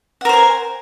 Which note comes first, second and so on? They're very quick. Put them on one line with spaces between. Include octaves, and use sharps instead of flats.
F#5 A#4 C5 G#5